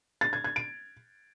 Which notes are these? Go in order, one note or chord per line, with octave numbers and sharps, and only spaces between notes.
A6
G#6
G#6
D7